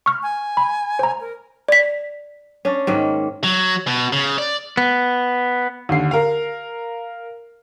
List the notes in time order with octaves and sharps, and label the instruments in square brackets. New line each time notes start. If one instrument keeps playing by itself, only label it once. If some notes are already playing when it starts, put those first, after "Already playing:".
[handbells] C#6 F6
[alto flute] G#5
[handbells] B5
C5 A#5
[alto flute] A#4
[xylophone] D5 B6
[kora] C#4 D4
G#2 D#3 A#3
[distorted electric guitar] F#3
B2
C#3
D5
[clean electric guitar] B3
[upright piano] D#2 D3 C7
A#4 F5